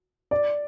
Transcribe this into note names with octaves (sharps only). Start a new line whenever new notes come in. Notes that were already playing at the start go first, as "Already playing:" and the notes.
D5